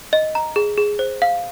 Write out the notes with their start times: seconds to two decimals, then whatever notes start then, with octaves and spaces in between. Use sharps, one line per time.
0.13 D#5
0.35 A#5
0.56 G#4
0.77 G#4
0.99 C5
1.22 F5